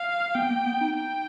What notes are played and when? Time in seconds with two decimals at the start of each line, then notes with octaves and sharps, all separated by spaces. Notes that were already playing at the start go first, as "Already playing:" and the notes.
Already playing: F5
0.35 B3 G5
0.50 A#3
0.66 B3
0.81 D#4
0.97 G5